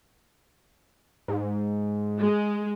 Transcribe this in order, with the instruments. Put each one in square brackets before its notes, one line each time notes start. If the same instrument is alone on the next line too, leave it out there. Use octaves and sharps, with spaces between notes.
[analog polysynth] G#2
[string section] G#3